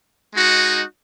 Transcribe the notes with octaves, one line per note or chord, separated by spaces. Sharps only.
G#3 D#4 F#4